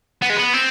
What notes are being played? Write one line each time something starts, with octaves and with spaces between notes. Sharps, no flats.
B3
G#3
B3
C4